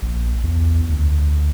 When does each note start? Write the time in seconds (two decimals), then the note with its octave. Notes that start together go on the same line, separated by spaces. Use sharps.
0.02 A#1
0.43 E2
0.89 D2